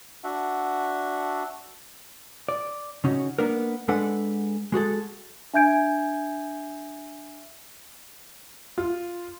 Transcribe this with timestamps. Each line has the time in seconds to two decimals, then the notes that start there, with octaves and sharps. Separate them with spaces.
0.24 D4 F#4 E5 F#5
2.49 D5
3.04 C#3 C#4 D#4 F#4
3.39 A#3 B3 D4 A#4
3.88 G#3 D4 A4 B4 F#5
4.72 G#3 F#4 G#4 A4
5.54 D4 E5 G#5 G6 G#6 D7
8.78 F4